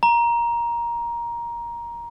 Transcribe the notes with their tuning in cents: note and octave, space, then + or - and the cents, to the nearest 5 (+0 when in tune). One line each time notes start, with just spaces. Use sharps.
A#5 +15